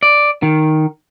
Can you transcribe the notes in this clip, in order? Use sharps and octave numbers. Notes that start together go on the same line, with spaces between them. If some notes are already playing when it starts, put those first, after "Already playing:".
D5
D#3